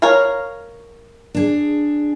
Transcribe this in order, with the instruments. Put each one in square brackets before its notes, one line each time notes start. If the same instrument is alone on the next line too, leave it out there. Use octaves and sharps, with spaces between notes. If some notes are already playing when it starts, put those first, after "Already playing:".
[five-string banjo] A#4 C#5 F5
[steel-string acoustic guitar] D4 G#4